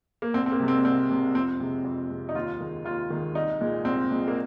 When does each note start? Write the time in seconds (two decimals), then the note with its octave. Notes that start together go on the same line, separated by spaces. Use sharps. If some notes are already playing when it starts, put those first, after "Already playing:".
0.22 A#3
0.34 C2 C4
0.46 C4
0.52 A#3
0.60 C3 G#3
0.68 C4
0.84 C2 C4
1.10 C3 G#3
1.35 F2 C4
1.60 C3 G#3
1.84 F2
2.10 C3 G#3
2.29 D#4
2.35 D#2 F4
2.60 D#3 G#3
2.85 D#2 F4
3.10 D#3 G#3
3.35 C2 D#4
3.61 A#2 G#3
3.85 C2 C4
4.10 A#2 G#3
4.28 A#3